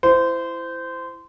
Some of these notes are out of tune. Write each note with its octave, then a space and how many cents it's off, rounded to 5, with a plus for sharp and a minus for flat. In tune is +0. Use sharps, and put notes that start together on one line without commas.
E4 +20 C5 -20